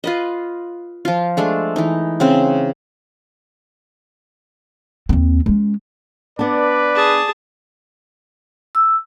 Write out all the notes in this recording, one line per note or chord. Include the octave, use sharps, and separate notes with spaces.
F4 B4 D#5
F3 F4
G#3 A3 D4
E3 D#4
C#3 C4
D#2 C4
G#3 C#4
B3 D4 B4 D5
G#4 A5
E6